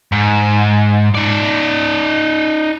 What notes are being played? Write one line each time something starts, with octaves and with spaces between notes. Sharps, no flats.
G#2
D#4 D5